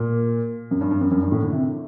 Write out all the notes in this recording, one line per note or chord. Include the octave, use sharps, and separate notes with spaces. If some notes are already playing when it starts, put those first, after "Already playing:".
Already playing: A#2
F#2
G2
G2
F#2
F#2
G2
A2
D3
C3